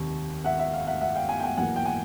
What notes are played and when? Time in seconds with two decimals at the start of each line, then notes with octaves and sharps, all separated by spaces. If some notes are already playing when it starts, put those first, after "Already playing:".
Already playing: F1 D#2 D#3
0.44 E5 F#5
0.59 E5
0.73 F5
0.87 E5 F#5
1.01 E5 F#5
1.15 F5 G5
1.29 F#5 G#5
1.39 G5
1.43 F#5 G#5
1.57 E2 B2 F#3 A#3 F#5 G#5
1.76 G5
1.85 F#5 G#5